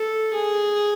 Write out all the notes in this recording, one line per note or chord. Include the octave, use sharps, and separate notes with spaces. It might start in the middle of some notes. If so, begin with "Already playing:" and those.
Already playing: A4
G#4